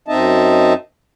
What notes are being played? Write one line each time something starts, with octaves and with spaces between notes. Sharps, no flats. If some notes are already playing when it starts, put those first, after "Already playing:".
F#2 C4 D#4 D#5 E5 A5